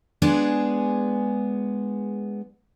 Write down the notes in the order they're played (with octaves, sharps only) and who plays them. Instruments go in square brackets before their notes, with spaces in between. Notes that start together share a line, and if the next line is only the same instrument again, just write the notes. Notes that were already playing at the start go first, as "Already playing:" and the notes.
[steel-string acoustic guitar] G#3 B3 D4 G#4